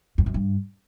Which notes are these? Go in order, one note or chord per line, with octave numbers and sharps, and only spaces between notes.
F2
F#2
G2